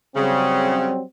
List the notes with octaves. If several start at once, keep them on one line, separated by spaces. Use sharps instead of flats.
C#3 F#3 G3 C4